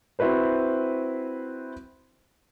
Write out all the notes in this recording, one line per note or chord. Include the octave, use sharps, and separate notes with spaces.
C4 E4 F#4 B4 C5